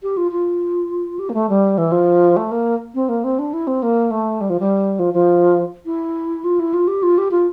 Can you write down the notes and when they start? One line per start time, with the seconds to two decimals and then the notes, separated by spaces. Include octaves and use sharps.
0.03 G4
0.17 F4
0.31 F4
1.19 G4
1.29 A#3
1.34 A3
1.49 G3
1.78 E3
1.92 F3
2.37 A3
2.51 A#3
2.95 C4
3.09 A#3
3.24 C4
3.39 D4
3.53 E4
3.67 C4
3.83 A#3
4.11 A3
4.41 G3
4.50 F3
4.60 G3
4.99 F3
5.14 F3
5.86 E4
6.44 F4
6.60 E4
6.74 F4
6.88 G4
7.03 F4
7.18 G4
7.31 F4